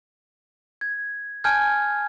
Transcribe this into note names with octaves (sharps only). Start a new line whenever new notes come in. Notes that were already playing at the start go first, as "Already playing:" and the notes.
G#6
G#5 A5 F6 G6 G#6